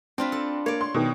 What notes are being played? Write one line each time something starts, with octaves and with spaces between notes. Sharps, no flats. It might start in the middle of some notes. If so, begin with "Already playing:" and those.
C4 D4 F4 B4
A4
A#3 C#5 D5
C6
B2 D#3